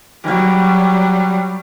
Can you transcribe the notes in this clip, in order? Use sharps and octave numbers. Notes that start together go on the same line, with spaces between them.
F#3 G3